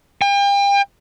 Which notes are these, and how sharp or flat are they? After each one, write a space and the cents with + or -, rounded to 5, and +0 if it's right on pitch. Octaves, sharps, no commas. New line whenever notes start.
G5 +40